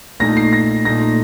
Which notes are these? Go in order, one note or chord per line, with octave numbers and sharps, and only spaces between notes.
A#2 A3 D#4 A#6
C7
A#6
A#2 A3 D#4 A#6